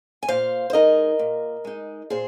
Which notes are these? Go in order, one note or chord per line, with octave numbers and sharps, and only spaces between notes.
G#5
A#2 C5 F5
C5
G#3 D#4 A#4 D#5
A#2
G#3 D#4
A#2 G#4 C5